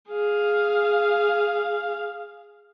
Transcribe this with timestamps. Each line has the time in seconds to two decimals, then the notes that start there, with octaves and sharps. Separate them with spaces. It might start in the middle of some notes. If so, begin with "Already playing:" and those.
0.10 G#4 F5